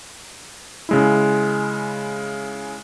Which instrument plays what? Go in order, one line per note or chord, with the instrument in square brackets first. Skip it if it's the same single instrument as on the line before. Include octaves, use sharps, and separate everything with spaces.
[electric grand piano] C#3 G#3 E4